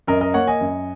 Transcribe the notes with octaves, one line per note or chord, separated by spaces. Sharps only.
F#2 A#4 D#5
A#4 D#5
A#3 C#5 F#5
D#5 G#5
F#2